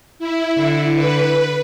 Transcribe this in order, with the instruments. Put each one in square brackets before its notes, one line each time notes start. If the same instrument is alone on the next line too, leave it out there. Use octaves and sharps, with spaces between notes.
[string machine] E4
[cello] D3
[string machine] B4